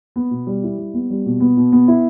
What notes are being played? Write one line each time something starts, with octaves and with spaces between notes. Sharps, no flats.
B3
B2
G3
E4
G3
B3
G3
B2
B3
B2
B3
E4